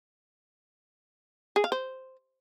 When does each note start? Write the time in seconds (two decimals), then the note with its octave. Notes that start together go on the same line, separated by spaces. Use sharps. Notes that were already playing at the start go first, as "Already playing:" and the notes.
1.56 G#4
1.64 F5
1.72 C5